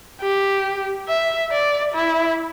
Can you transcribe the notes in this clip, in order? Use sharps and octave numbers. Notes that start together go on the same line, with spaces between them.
G4
E5
D5
E4